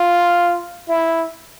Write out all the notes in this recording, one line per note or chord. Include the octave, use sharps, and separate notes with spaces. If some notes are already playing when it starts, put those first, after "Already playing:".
Already playing: F4
E4